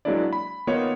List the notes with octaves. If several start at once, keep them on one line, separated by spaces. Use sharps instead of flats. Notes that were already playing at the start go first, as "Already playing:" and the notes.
F#3 G#3 A#3 D4 E4 D5
B5
D#3 A#3 B3 D#4 F4 C#5